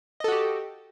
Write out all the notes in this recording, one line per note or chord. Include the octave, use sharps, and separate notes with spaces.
F#4 G4 A4 D#5